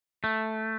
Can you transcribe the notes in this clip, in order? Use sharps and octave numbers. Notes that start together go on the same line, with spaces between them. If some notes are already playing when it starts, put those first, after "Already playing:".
A3